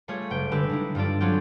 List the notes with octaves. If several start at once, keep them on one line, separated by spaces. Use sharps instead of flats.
G3 A3 F4 G#4 C#5
F#1 G5
D3 G#3 G4 B4 E6
D3 D#4 E4
G2 G3 F4 A4 D5
F#3 C4 C#4 F4 G4